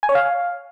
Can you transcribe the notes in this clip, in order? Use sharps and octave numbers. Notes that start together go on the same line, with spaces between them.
G#5
C#5
F5